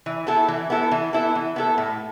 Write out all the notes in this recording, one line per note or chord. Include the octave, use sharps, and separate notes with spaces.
E3
B3 E4 A4
E3
B3 E4 A4
E3
B3 E4 A4
E3
B3 E4 A4
A2